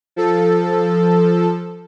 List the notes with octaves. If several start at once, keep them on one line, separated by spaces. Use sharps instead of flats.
F3 A4